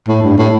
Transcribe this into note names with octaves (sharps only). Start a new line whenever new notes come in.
A2
G2
A2